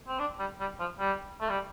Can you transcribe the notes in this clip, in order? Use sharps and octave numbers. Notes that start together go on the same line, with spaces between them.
C4
D4
G3
G3
F3
G3
A3
G3